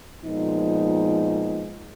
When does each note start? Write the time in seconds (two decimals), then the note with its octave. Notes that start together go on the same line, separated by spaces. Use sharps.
0.23 A#2 F3 G#3 B3 D#4